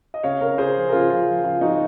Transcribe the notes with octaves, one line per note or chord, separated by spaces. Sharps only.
D#5
C#3 C#5 F5
C#3 A#4 C#5
C#3 G#4 C5
F3
A#4
C#3 F4 G#4
F3 F4
F3
C#3 F4
F3 D#4 F#4